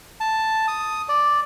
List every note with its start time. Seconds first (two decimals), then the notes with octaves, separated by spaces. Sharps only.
0.20 A5
0.68 D#6
1.09 D5